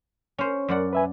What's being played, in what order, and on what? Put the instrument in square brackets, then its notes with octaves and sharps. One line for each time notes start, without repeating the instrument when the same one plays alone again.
[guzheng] C#4 C5
F#2 D5 F#5
[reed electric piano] B4 E5 G#5